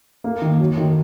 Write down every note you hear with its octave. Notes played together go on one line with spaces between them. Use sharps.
A#3
D#3
F#3
D#3